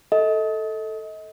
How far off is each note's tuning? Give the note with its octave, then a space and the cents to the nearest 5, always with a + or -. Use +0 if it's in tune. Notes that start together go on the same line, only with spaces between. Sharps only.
A4 +0 D#5 +30